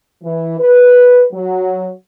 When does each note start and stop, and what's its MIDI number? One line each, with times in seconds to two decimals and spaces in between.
0.24 0.58 52
0.59 1.22 71
1.32 1.91 54